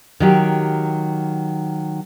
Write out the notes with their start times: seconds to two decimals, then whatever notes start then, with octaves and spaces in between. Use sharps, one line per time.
0.20 D#3 F#3 G4